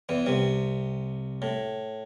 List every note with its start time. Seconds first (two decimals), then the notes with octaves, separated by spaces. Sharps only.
0.09 E2 E3
0.26 C2 C3
1.42 A2